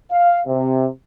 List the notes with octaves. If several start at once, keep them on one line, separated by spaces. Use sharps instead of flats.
F5
C3